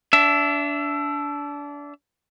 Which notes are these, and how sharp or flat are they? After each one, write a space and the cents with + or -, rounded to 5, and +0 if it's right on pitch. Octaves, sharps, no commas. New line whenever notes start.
D4 -25 E5 +10